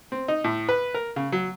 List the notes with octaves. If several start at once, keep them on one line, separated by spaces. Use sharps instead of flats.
C4
D#4
A2
B4
A#4
C#3
F#3